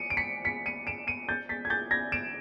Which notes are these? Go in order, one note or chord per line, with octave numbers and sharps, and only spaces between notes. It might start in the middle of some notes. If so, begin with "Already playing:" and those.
Already playing: C#7 D#7
D7
B6 C#7
B6 C#7
C#7 D#7
D7 E7
C#7 D#7
G6 A6
A6 B6
G#6
G6 A6
G#6 A#6
D7 E7